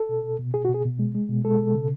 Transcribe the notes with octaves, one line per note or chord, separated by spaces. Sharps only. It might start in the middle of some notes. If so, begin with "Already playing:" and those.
Already playing: A4
B2
B2
B2
B2 G#4
F#4
B2
G#4
B2
G#3
G#3
B2
G#3 A4
B2
C#3